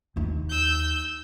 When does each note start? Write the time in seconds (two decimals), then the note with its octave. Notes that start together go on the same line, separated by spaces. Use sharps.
0.16 D#2 D#4
0.50 E6 G6